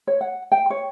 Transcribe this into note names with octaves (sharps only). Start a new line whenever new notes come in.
C#5
F#5
G5
C#5